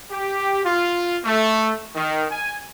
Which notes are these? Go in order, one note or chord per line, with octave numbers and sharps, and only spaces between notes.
G4
F4
A3
D#3
G#5